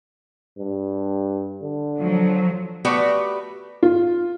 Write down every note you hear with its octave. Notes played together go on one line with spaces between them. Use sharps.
G2
D3
F3 F#3
A3 B3 F#4 G4 B4 D5
F4